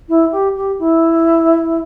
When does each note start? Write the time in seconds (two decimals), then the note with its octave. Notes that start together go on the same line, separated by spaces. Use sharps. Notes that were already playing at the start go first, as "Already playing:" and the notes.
0.08 E4
0.31 G4
0.55 G4
0.78 E4